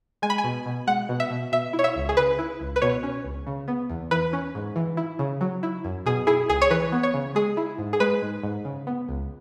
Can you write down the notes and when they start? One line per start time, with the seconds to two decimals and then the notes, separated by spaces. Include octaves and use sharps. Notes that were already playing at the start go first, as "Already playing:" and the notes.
0.22 G#3 G#5
0.30 B5
0.38 G#5
0.44 B2
0.66 B2
0.87 G#3 F#5
1.09 B2
1.20 E5
1.30 B2
1.52 B2 E5
1.73 E4
1.79 C#5
1.84 E5
1.96 C#2
2.09 G#4
2.17 C#3 B4
2.39 E4
2.61 C#2
2.76 B4
2.82 B2 C#5
3.03 C#4
3.25 C#2
3.47 C#3
3.68 B3
3.90 E2
4.11 E3 B4
4.33 C#4
4.55 G#2
4.76 E3
4.97 E4
5.19 C#3
5.41 F#3
5.63 E4
5.84 F#2
6.06 B2 G#4
6.27 E4 G#4
6.49 C#2 G#4
6.62 C#5
6.71 E3 B4
6.92 B3
7.03 C#5
7.14 C#3
7.35 G#3 G#4
7.57 E4
7.78 G#2
7.93 G#4
8.00 G#3 B4
8.22 G#2
8.44 G#2
8.65 C#3
8.87 B3
9.09 C#2